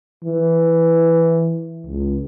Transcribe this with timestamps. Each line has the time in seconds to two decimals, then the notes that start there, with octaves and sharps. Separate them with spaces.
0.25 E3
1.87 C#2